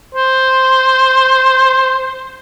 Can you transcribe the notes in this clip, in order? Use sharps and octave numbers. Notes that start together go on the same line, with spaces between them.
C5